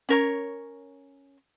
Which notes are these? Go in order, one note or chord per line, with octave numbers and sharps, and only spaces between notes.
C#4 A#4 C#5